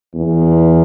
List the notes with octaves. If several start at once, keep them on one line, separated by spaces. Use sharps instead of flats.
E2